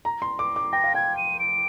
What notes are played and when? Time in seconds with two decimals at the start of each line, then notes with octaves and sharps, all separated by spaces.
0.05 A#5
0.22 C6
0.39 D6
0.56 D6
0.73 G5 A#6
0.84 F5
0.94 G5 G#6
1.17 D#7
1.40 D7